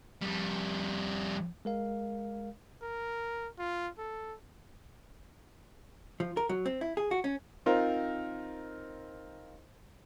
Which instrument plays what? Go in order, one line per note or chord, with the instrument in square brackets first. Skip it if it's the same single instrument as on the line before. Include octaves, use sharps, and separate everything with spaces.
[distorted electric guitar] F2 G3
[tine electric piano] G#3 A#4 F5
[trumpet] A#4
F4
A4
[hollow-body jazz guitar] F3
A#4
F#3
C4
E4
G#4
F#4
C#4
[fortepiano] C4 D#4 F4 A#4 C5